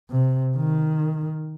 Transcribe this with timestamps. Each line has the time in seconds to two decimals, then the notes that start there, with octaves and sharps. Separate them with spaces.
0.11 C3
0.57 D#3